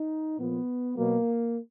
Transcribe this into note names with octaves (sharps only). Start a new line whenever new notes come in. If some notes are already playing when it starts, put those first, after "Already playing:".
Already playing: D#4
A#2 F3 B3
B2 F#3 A#3